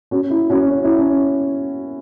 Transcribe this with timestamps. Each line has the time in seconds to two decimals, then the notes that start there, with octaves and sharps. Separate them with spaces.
0.11 C#4 F#4
0.30 E4
0.50 C#4 F#4
0.69 C#4
0.84 E4
0.98 C#4